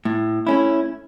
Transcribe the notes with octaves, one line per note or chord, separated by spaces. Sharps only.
A2
A3 C#4 E4